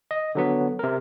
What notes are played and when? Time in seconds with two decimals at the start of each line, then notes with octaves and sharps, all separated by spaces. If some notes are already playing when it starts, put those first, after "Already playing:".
0.11 D#5
0.35 D3 F#3 B3
0.79 C3 A#4